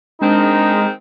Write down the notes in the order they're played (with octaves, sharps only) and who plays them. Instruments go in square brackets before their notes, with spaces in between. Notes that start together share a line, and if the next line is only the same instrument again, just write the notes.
[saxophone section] D#3 C4 [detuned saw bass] G#3 [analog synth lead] D4 [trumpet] D#4